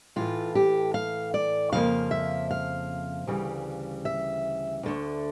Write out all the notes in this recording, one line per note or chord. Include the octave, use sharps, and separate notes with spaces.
A2 E3 A3 F4
G4
F5
D5
F2 C#3 F3 A#3 F5
E5
F5
D2 C#3 E3 G3
E5
D2 D3 A3